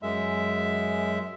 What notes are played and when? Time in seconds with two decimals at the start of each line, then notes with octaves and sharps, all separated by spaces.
0.02 F#2 G#3 E5